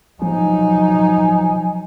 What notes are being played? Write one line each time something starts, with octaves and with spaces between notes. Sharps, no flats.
F3 F#3 D#4 G#5